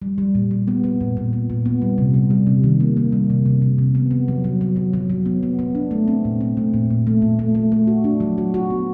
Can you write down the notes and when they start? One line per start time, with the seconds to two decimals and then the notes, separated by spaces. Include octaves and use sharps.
0.02 G3
0.18 G3
0.35 A#2
0.51 G3
0.68 B3
0.84 B3
1.01 A#2
1.17 A#2
1.33 B3
1.50 A#2
1.66 B3
1.82 G3
1.98 C3
2.14 G3
2.30 G3
2.47 C3
2.64 D#3
2.80 A#3
2.97 A#3
3.12 G3
3.30 C3
3.46 C3
3.62 C3
3.78 C3
3.95 B3
4.11 B3
4.28 F#3
4.44 F#3
4.61 F#3
4.76 F#3
4.93 F#3
5.10 F#3
5.26 B3
5.43 B3
5.59 B3
5.75 D4
5.91 A3
6.08 C4
6.25 A#2
6.41 C4
6.57 A3
6.74 A#2
6.90 A#2
7.07 A3
7.22 A#2
7.39 A3
7.55 A3
7.72 A3
7.87 F#4
8.04 D4
8.20 F#3
8.38 F#4
8.54 F#4
8.70 B3